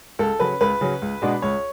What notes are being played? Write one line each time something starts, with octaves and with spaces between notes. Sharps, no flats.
C#2 A4
C#3 F#3 C#4 B4
C#2 B4
C#3 F#3 C#4
C#2
B2 G#3 B3 D4
C#2 C#5